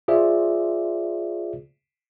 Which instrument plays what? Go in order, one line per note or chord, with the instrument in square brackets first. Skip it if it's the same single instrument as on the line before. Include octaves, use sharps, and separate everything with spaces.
[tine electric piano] F4 G#4 C5 D5 E5